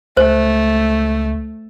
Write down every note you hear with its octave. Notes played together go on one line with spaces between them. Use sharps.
C#2 A3 C5